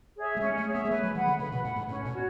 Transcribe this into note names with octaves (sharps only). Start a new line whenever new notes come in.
G#4 C#5 E5
A3
G#3 C#4
A3
G#4 C#5 E5
B3
G#3
A3 B4
F#3
E3 F#5 B5
D3
C#3 B4
B2
A2 F#5
B5
G#2
A2 C#4
B2
F#4 C#5